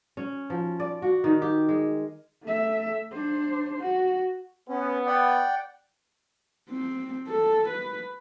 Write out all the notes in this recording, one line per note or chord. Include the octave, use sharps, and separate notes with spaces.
C#4
F3
D5
F#4
D#3
G4
G#3
A3 E5
D4 C5
F#4
B3 C#4
D5 F#5 G5
C4
A4
B4